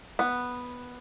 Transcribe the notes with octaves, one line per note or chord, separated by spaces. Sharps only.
B3